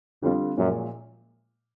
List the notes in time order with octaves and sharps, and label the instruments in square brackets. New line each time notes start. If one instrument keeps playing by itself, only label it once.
[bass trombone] F2 [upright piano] D3 G3 C4 F4
[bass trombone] F#2 [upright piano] A#2 F3 G#3